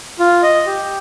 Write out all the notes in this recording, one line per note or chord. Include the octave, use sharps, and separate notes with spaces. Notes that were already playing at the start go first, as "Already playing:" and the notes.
F4
D#5
G4